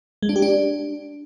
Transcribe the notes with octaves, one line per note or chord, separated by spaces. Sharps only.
G#3
D4
G4
D4